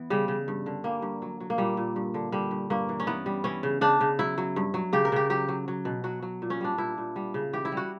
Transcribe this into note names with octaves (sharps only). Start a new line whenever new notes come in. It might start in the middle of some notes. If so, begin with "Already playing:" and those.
Already playing: E3 B3
C#3 G3
C#3
G2
D3
G3 A#3
G2
F#3
F#3
A#3
A#2 G3
A#2
G2
D3
D3 G3
G2
G2 A#3
E3
C#4
E3 B3
G3
E3 C#4
C#3
C#3 D4
C#3
F#3 E4
F#3
G2
F#3
C#3 G4
A#4
C#3 G4
F#3 G4
F#3
F#3
B2
F#3 F#4
F#3
A#2
C#4
G3 D4
A#2 E4
A#2
G3
C#3
E3 G4
E4
G3 F#4